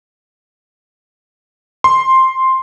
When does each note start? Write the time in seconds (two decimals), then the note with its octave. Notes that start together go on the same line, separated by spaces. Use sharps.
1.84 C6